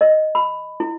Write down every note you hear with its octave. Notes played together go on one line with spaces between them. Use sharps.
D#5
B5
E4